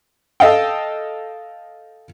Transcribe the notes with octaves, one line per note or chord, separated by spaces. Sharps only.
A4 D#5 F5 G5